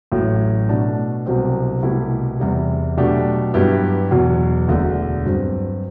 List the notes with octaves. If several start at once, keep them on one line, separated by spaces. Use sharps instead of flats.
A1 A2 F#3
B2 A3 D4
C2 B2 F#3 C4 G4
C2 B2 A3 E4 G4
E2 C3 G3
B2 F#3 A3 D4 G4
G2 F#3 B3 E4 G4
E2 B2 F#3
E1 D2 D3
G2 F#3 C4